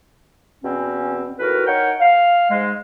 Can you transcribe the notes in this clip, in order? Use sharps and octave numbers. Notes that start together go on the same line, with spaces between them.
E2 B2 C4 C#4
D#2 A2 F#4 A#4 B4
D#4 A#4 C#5 F#5 G5
F5
G#2 G#3